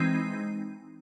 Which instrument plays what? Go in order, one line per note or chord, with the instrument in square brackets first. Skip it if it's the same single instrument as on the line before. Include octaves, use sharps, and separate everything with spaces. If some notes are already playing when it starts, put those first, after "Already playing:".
Already playing: [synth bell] E3 G#3 C4 D#4